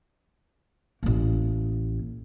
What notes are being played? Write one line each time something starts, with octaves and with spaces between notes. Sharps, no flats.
A1 A#3